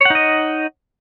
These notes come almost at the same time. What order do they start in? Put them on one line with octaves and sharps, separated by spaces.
C#5 F#5 D#4 D#5